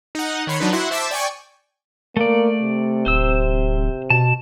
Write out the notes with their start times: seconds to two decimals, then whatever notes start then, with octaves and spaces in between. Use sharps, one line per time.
0.15 D#4 F#5
0.47 D#3 C#5 B5 C6 C#7
0.60 F#3 D4 D#4 B4
0.73 E4 F#4 F#5 C6
0.91 C5 E5 A5 D6 E6 B6
1.11 D5 G5 G#5 C#6
2.17 A3 A#3 D5
2.62 C3
3.06 D1 C5 E6
4.10 B2 A5